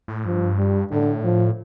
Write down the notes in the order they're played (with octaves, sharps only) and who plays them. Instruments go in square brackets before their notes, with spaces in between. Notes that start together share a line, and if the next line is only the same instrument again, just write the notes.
[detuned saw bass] A2
[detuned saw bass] G2 [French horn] F3
[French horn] G3
[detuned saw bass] A2 [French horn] D3
[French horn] F3